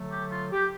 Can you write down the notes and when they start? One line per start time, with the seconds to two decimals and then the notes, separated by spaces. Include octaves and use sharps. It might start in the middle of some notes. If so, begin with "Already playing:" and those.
Already playing: D3 F#3 A3
0.12 G4
0.32 F4
0.51 G4